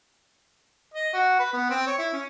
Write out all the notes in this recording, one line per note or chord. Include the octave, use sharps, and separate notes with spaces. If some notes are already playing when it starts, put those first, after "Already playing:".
D#5
F#4
B4
B3
C4
C#5
E4
C#4